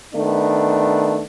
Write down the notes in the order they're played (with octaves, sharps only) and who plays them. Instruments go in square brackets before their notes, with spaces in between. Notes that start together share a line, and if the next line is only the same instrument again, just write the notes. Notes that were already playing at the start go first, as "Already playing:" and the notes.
[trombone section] D#3 A3 B3 D4